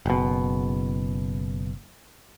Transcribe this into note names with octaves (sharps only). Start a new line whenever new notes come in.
F#1 B2